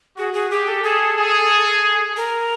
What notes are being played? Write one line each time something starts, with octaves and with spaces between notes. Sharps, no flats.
F#4 G#4
G#4
G4 G#4
A4
G#4 A4
G#4
A#4